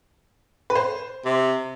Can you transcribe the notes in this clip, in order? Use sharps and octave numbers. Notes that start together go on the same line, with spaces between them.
B4
C5
C3